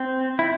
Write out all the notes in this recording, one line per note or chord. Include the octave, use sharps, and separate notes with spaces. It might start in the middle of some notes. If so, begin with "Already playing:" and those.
Already playing: C4
E4